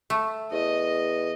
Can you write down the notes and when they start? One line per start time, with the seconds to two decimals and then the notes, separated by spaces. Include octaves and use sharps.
0.10 A3
0.52 E2 D#5